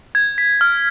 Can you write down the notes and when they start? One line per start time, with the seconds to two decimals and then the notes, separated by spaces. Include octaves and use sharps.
0.15 G#6
0.38 B6
0.61 F6